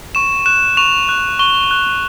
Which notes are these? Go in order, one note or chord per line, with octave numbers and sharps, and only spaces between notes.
C#6 E7
F#6 E7
C#6 F7
F#6
C#6 G7
F#6